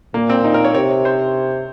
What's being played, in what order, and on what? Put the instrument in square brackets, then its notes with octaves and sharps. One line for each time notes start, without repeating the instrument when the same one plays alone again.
[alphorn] A#2 [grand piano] A#3
[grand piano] C4
D#4
A#4
C#5
[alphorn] C3 [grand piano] C#5
[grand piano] C5